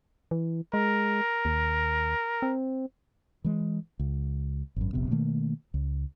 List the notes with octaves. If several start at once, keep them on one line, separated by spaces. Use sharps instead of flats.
E3
G#3 A#4
D#2
C4
E3 G#3
C#2
G#1 F#2
E1 A#1 C3 B3
B2 D#3 A3 A#3
C#2